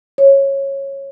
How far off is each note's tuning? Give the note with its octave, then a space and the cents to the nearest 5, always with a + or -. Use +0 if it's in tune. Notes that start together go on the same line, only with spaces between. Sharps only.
C#5 -15